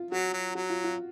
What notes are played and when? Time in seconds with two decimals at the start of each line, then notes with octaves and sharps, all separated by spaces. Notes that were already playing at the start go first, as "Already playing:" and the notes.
Already playing: F4
0.11 F#3 F#4
0.33 F#3
0.55 F#3 F#4
0.70 F4
0.84 F4